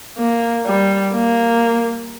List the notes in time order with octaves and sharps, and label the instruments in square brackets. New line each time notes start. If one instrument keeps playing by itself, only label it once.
[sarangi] A#3
G3
A#3